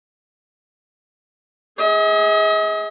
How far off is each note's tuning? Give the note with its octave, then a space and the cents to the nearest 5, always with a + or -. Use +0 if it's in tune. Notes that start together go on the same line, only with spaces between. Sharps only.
G#4 -10 D#5 +45